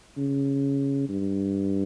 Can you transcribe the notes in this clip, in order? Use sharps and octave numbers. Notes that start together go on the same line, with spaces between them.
C#3
G2